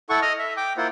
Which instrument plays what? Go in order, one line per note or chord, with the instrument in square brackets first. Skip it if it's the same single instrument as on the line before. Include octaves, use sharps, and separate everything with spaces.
[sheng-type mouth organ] E4 A4 F#5 C#6
D#5 D#6 F6
E5
G5 D6
A#3 E4 F4 C5 F#5